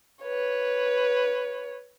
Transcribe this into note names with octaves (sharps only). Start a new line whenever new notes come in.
B4 C#5